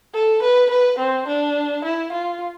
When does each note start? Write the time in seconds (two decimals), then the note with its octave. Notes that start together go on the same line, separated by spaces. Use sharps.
0.14 A4
0.43 B4
0.70 B4
0.99 C4
1.28 D4
1.84 E4
2.13 F4